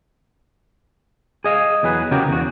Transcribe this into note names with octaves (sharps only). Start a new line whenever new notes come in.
G#4 D#5 F5
E2 F#3 G#4 B4
C#3 F#3 F#4 G4 A#4
E2 F#4